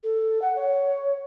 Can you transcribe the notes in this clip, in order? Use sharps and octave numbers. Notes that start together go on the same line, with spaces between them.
A4
F#5
C#5